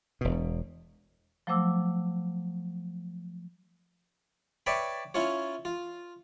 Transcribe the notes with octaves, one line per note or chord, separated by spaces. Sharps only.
E1 B2
F3 F#3 A3 C5 D6 E6
B4 C#5 D5 E5 G5 B5
C#4 E4 F4 C#5
F4